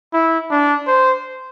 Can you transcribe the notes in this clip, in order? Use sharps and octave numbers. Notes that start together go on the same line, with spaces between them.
E4
D4
C5